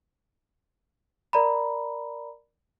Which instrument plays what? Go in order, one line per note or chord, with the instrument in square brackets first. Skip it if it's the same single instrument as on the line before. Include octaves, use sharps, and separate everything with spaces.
[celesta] A#4 D5 A#5 B5